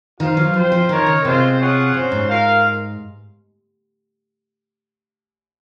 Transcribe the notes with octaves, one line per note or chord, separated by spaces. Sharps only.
D#3 F4 C5 F5
F#3
F3 C4 F4 C5
F3
D#3 D#4 A#4 C#5
C#3
C3 G#3 C4 F4 C5
F4 G#4 C#5 F#5
A#2 C#4 F#4 C5
G#2
F4 A#4 F5